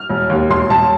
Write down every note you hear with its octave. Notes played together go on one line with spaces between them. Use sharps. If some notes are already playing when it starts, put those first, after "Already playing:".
Already playing: F6
E1
D#2
E1 C6
E1 A5